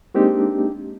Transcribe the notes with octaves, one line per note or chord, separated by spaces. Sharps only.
G#3 A#3 C4 D4 D#4 G4